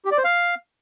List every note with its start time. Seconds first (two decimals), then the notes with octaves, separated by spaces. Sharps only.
0.05 G4
0.11 D5
0.18 C5
0.24 F5